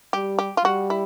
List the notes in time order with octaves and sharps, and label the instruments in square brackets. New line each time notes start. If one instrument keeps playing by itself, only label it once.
[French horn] G3 [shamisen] G4
[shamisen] G4
F4
[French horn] G3 [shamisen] F#4
[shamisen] E4